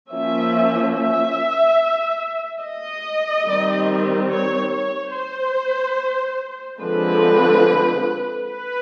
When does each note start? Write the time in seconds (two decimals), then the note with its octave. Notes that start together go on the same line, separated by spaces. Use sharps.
0.10 F3 A#3 C#4 E5
0.94 E5
2.61 D#5
3.45 D#3 G3 C4
4.29 C#5
4.71 C#5
5.12 C5
6.80 D3 F3 G#3 C4 B4
8.47 B4